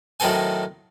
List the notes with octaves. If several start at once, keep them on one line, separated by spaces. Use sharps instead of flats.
A2 D#3 F#3 C4 A4 G#5